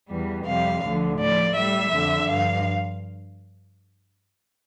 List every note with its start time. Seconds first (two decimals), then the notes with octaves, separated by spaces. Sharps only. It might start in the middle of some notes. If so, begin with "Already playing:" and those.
0.10 E2 E3 G3
0.46 F2 C3 G3 F5
0.83 D2 D3 F3
1.19 A2 F3 D5
1.55 A2 G3 E5
1.92 F2 D3 F3
2.28 G2 F3 F5